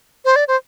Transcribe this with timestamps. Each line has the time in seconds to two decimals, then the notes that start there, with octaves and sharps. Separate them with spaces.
0.25 C5
0.36 D5
0.48 C5